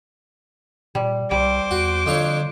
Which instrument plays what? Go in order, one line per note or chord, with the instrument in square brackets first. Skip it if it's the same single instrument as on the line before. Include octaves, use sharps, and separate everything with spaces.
[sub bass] A#2 [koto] G3
[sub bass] C2 [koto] G3 [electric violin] C5 D6
[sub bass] E2 [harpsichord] F#4
[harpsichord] F2 D4 C#5 [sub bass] D3